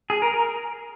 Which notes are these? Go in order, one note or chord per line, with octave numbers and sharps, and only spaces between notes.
G#4
A#4
A#4